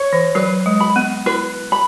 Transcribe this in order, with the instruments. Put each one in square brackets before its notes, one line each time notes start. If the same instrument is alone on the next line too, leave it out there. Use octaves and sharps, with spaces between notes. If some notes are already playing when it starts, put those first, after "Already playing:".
Already playing: [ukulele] C#5
[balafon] E3
[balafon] F#3 [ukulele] B4
[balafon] G#3
[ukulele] B5
[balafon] B3
[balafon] E4 [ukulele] B4
[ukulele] B5